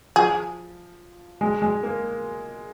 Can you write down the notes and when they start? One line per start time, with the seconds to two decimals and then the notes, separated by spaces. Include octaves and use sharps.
0.16 F3 G#4
1.41 G#3
1.62 G#3
1.83 A#3